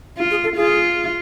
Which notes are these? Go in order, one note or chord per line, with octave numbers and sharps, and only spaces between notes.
F4
G#4
A4
F4 G#4